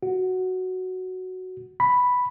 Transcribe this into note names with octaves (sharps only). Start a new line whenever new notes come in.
F#4
B5